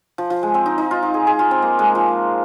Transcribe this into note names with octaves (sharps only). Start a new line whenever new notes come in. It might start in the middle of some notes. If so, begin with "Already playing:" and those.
F3
F3
G#3
C4
D#4
D#4
F4
F4
G#4
G#4
F4
C4
A#3
G#3
F3